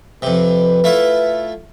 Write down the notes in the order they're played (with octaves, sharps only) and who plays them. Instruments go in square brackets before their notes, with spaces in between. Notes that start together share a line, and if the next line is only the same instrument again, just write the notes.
[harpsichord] F2 C3 [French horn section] B4
[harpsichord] A3 E4 F4